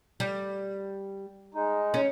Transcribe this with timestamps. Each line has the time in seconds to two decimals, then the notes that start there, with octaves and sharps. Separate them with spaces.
0.20 G3
1.54 G#3 D#4
1.94 C#4